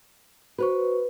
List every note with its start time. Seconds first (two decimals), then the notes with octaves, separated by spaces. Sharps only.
0.59 F#4 B4 C5 C#6